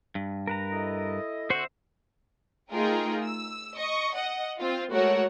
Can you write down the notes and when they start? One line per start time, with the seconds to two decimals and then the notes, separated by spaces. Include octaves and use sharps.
0.15 G2
0.47 A#4 B4 A#5
0.72 E4 A4 D#5
1.50 D3 C4 F#4 C5 E5
2.72 A3 D#4 F4 G#4 A#4 G5
3.24 E6
3.77 D#5 C#6
4.16 D#5 F#5
4.59 C4 F4
4.93 G#3 A3 F#4 A#4 C#5 F#5